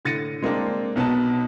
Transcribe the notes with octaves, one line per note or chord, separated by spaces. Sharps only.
A2 D3 A6 A#6 C#7 D#7
G#3 A#3 C4 D4
B1 B2 B3 D#4 A5